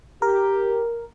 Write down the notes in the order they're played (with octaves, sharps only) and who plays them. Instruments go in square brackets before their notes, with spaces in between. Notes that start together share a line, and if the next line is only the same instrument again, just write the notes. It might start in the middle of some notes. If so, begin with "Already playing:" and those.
[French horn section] G4 [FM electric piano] A#4